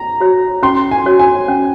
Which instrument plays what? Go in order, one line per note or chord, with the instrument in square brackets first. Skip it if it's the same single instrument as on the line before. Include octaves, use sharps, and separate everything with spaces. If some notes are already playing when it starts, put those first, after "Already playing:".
Already playing: [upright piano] A#5
[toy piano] F#4 C#5
[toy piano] C#4 [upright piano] C6
[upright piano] G#5
[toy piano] F#4 C#5
[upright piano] G#5
[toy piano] C#4